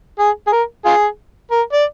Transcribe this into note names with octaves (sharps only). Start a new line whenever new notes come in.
G#4
G#4
A#4
F4 G#4
A#4
D5